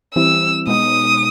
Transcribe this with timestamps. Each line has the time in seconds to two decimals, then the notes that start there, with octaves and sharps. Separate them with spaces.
0.15 E3 G3 C4 E4 E6
0.67 B2 G#3 B3 D#4 D#6